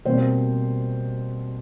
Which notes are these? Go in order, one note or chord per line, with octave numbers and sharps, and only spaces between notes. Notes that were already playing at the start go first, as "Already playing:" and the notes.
B2 G3 A#3 C4 C5